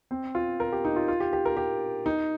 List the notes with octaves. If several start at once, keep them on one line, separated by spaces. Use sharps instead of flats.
C4
F4
A#4
G4
D#4
F4
F4
G4
G4
A#4
G4
D#4